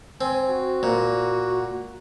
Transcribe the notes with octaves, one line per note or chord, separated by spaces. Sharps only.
C4 G#5
F#4
A#2